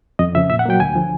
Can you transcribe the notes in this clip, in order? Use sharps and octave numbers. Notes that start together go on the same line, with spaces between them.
F2 D#5
C#3 F3 E5
A#2 E5
F#5
F#3 A#3 G5
D2 G#5
D3 F3